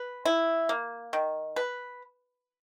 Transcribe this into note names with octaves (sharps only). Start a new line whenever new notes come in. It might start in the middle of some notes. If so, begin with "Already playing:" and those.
Already playing: B4
E4
A#3
D#3
B4